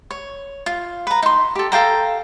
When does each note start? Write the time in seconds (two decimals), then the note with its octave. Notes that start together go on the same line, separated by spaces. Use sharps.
0.11 C#5
0.66 F4
1.07 B4 A#5
1.22 D#4 C6
1.55 G4 A4
1.72 A4 F5 G5 A#5